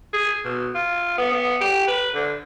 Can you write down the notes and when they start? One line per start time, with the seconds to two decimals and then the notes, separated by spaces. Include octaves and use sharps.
0.13 G#4
0.44 B2
0.74 F4
1.18 B3
1.31 B3
1.60 G4
1.88 B4
2.14 D3